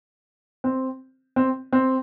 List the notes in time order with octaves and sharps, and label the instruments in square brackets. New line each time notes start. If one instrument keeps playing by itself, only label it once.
[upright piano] C4
C4
C4